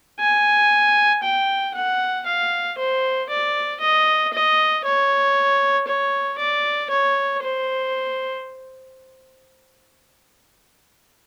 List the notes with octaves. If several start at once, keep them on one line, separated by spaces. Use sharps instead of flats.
G#5
G5
F#5
F5
C5
D5
D#5
D#5
C#5
C#5
D5
C#5
C5